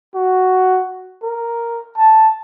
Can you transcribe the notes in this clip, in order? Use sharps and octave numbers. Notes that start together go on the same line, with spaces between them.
F#4
A#4
A5